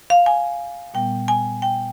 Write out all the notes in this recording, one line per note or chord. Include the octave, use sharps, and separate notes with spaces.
F5
G#5
A#2 G3 B3 G5
G#5
G5